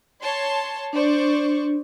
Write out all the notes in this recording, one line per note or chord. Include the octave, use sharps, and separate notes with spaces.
C#5 A5 C6
D4 C5 D5 C#6